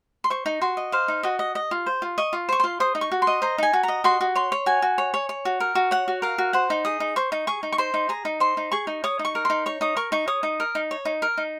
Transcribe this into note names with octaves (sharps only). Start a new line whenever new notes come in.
C6
C5 C#6
D#4
F#4 C6
D#5
C5 F5
D#4
F#4 D#5
D#5
D#5
F4
C5
F4
D#5 C#6
F4
C5 C#6
F4 C6
C5 D#6
D#4
C#6
F#4
C6
D#5
C5 A#5
D#4 G#5
F#4
D#5 A#5
F#4 C6
F#4
C#5 C6
C#5
F#4 G#5
F#4
C#5
C#5
C#5
F#4
A#4
F#4
C#5 F#5
F#4
A#4 F5
F#4
C5 F#5
D#4
G#4 D#6
D#4
C5 C#6
D#4
G#4 C#6
D#4
C#6
C5 C6
D#4
G#4 A#5
D#4
C5 C6
D#4
G#4 C#6
D#4
C#5 D#6
D#4
C#6
A#4
D#4 C6
C#5 C#6
D#4 D#6
A#4 C#6
D#4 C#6
C#5 D#6
D#4
A#4
D#4
C#5
D#4
A#4
D#4